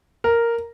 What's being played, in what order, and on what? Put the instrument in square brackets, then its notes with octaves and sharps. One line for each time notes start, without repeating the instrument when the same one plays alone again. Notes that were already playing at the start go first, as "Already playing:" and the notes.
[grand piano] A#4